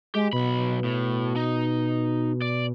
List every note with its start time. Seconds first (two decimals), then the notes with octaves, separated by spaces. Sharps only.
0.15 G#3 G4
0.33 B1 B2 B5
0.84 A2
1.36 D#4
2.42 D5